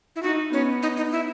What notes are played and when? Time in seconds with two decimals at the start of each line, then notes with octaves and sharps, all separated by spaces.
0.16 E4
0.23 D#4 F#4
0.53 B3 C#4
0.82 D#4
0.97 D#4
1.12 E4